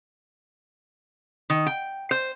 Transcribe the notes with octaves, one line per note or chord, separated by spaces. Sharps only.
D#3
G5
C5